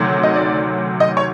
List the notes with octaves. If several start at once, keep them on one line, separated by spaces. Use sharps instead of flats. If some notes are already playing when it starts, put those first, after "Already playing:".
Already playing: D2 C3 D#3 F#3
D#5
D5
D#5
C#5